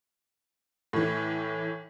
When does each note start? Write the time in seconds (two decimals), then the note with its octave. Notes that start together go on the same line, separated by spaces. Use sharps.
0.93 A2 E3